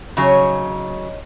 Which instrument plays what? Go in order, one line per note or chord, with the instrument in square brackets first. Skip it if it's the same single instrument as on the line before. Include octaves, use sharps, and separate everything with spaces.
[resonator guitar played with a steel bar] C#3 F#3 [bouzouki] D#4 C#5 G#5